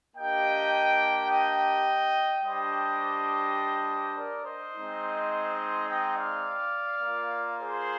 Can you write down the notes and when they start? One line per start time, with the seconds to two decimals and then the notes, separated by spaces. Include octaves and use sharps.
0.16 A#3 D4 G4 D#5 G5
1.31 D#5 G5
2.45 G3 D4 G4 C5 D#5
4.17 A#4 D5
4.46 C5 D#5
4.75 G#3 C4 D#4
5.88 D#5 G5
6.17 D5 F5
7.02 A#3 F4
7.60 G#4 C5